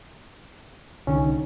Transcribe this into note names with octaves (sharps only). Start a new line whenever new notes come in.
C2 D3 D#3 C#4